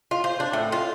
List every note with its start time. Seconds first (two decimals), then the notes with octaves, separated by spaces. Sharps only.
0.11 F4
0.24 C5
0.40 D4
0.53 A2
0.72 F4